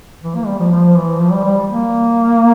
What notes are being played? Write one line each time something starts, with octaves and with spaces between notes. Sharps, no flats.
E3
A#3
G3
F3
F3
E3
F3
G3
G3
A#3